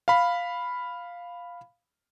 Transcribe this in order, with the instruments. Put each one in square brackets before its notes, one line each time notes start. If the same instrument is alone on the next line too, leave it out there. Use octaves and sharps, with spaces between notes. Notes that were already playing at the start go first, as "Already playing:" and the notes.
[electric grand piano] F5 B5